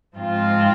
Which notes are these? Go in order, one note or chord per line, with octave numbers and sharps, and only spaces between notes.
G#2 F3 C4 F4